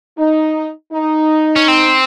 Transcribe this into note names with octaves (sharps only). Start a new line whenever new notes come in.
D#4
D#4
C#4
C4